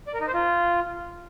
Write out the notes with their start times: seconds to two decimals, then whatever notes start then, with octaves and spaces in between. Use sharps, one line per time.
0.07 D5
0.14 A#4
0.21 D#4
0.27 C5
0.34 F4